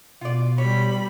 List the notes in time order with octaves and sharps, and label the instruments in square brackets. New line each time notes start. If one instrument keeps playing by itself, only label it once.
[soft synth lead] B2 [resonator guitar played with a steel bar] F4 D5
[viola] G3 B5 [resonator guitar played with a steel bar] C#5